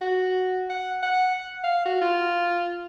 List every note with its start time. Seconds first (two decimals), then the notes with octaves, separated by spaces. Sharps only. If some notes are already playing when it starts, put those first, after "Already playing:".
0.01 F#4
0.70 F#5
1.03 F#5
1.64 F5
1.85 F#4
2.01 F4